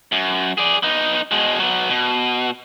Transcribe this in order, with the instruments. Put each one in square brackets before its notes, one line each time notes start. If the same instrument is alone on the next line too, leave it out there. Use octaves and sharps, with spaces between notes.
[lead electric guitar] F#2
G#4 D5
B3 D#4
B2 G#3
F#3 B3
B2